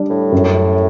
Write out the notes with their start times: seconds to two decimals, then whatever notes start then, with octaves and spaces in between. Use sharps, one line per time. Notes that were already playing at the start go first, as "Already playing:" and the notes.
Already playing: G3 D4
0.10 A2
0.32 F#2